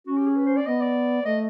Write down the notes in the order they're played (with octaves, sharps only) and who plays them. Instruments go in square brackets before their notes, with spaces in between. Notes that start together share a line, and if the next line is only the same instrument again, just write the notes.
[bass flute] C#4 [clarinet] F#4
[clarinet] G4
G#4
B4
C5
D5
[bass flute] B3 [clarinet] D#5
[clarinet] D5
[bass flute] A3 [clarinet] D#5